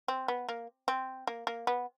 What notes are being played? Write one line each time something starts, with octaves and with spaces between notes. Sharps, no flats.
C4
B3
A#3
C4
A#3
A#3
B3